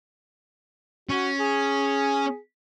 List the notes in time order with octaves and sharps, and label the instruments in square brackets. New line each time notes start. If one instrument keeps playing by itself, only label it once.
[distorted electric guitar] C#4 [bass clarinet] F#4
[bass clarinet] G#4